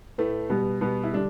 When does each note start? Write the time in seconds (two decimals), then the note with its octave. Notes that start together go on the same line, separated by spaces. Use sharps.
0.18 A2 A3 B4
0.50 B2 G3 B3
0.81 B2 G3 B3
1.04 E4
1.13 D3 G3 D4